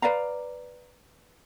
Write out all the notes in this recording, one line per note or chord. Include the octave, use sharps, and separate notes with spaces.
B4 D5 F5 A#5